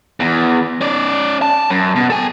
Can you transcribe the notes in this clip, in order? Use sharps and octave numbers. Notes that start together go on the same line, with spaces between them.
E2
C#4 D5
A5
F#2
B2
A4 G#5